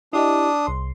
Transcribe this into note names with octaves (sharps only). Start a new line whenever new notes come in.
D4 E4 G4 D#5 D#6
C2 C6